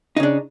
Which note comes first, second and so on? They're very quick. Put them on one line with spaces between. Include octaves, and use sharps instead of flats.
D#4 C#3 D4